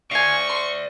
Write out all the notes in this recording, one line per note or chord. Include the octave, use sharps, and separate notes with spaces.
F4 D5 E5 G#5 C#6
C6